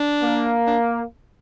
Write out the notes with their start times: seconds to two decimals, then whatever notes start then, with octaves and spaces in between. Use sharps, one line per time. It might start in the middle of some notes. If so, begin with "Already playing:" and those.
Already playing: D4
0.22 A#3
0.67 D4